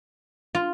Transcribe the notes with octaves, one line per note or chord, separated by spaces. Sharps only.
F4